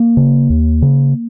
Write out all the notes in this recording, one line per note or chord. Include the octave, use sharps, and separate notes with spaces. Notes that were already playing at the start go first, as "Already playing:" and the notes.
Already playing: A#3
C#3
D#2
C#3